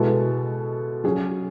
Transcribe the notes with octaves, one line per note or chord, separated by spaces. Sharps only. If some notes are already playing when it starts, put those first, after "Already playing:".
Already playing: B2 G#3 B3 E4 A4
F#3 C#4 G#4